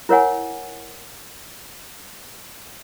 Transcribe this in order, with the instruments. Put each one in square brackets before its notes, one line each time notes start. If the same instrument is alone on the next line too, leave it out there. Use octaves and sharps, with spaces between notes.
[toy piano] E4 A#4 C#5 F#5 G#5